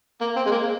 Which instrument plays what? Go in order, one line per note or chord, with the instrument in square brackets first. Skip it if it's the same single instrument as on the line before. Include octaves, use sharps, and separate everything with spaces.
[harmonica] A#3
C4
G#3
A#3